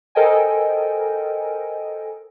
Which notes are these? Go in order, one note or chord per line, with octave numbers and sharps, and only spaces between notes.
A4 A#4 C5 D#5 G5 G#5